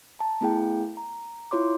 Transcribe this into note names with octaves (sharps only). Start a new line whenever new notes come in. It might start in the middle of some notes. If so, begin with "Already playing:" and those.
A5 A#5
A3 B3 E4 G#4 G5
A#5
E4 F4 C#5 C6 D6